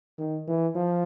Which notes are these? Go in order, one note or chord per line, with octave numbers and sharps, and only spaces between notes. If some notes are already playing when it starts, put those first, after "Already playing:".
D#3
E3
F3